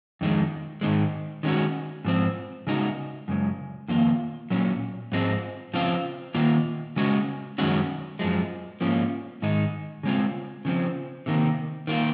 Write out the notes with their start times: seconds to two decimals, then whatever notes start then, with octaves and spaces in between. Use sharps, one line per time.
0.21 F2 D#3 G#3
0.81 G#2 D#3 G#3
1.43 D#3 G#3 C#4 F#4
2.05 G#2 F3 C4
2.67 C#3 G#3 D#4 F#4
3.28 F#2 C#3 G#3
3.88 F2 D#3 A#3 F4
4.50 A#2 F#3 C#4
5.12 G#2 F3 G#3 C4
5.74 C#3 F3 C4 F4
6.34 D#3 A#3 F4
6.96 C#3 G#3 C#4 F#4
7.58 F#2 D#3 G#3 C#4 F#4
8.19 F#2 F3 G#3
8.81 G#2 F3 A#3 C#4 F4
9.42 G#2 D#3 G#3 D#4
10.03 C#3 G#3 C4 F4
10.65 C#3 F3 C4
11.26 C3 D#3 A#3
11.87 D#3 A#3 F4